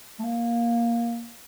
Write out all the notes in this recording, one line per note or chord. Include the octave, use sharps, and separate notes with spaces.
A3
A#3